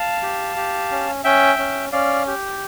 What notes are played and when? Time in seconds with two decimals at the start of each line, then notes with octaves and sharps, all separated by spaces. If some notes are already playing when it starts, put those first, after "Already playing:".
Already playing: F5 A5
0.23 G4
0.56 G4
0.91 C#4
1.24 C#4 E5 G5
1.59 C#4
1.92 C#4 D5 F5
2.27 G4